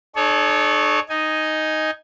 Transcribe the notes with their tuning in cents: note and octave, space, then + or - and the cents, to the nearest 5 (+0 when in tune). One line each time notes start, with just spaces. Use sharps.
D4 +45 A4 -35 C#5 +0
D#4 +0 G#5 +0